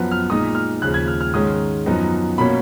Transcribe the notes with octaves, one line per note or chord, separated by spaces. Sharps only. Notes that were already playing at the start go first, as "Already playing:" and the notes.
Already playing: F#2 F3 B3
F6
A#2 G#3 D#4 D#6
F6
D#2 C#3 F3 F#6
G#6
F6
F6
G#2 D#3 G#3 C#4 D#6
F#2 F3 B3 D#4
B2 A#3 C#4 B5